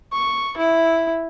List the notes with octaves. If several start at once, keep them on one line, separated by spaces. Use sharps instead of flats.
C#6
E4